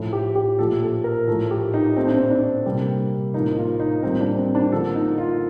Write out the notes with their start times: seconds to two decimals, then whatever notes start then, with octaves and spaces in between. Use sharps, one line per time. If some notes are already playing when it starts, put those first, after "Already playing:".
Already playing: A2 F3 A3
0.13 G4
0.35 G4
0.58 A#2 F3 A3 A4
0.82 A4
1.04 A#4
1.27 A2 F3 A3 A4
1.51 G4
1.74 D#4
1.96 A#2 A3 C4
2.07 D4
2.17 C4
2.31 D4
2.65 C3 G3 A#3
3.34 A2 F3 A#3 D#4
3.57 F4
3.80 D#4
4.03 A2 G3 A#3 C4
4.21 D4
4.37 C4
4.55 D4
4.72 D3 F3 A#3 A4
4.95 D#4
5.18 F4